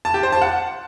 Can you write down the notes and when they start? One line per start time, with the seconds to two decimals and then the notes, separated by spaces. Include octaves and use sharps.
0.05 A5
0.14 G4
0.23 C5
0.32 A5
0.42 F#5